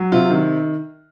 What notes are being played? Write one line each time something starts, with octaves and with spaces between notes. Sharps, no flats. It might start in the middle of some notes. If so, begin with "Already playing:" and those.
Already playing: F#3
C3 F4
D#3